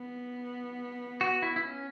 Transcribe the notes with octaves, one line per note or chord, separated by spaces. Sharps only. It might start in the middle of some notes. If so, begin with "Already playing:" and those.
Already playing: B3
F#4
E4
E4
C#4